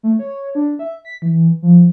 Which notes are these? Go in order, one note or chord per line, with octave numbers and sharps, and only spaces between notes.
A3
C#5
D4
E5
B6
E3
F3